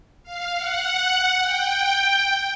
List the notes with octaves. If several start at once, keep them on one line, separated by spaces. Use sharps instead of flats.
F5
F#5
G5